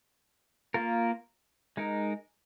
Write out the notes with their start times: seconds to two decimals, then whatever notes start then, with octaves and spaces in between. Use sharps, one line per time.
0.74 A#3 F4 A#4
1.77 G#3 D#4 A#4